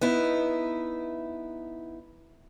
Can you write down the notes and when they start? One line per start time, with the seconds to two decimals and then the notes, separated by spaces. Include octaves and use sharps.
0.01 B3 D#4 E4